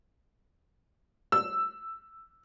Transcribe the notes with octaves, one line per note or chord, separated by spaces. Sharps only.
E6